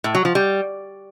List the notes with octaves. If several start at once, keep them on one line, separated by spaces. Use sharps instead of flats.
A2
F#3
F3
G3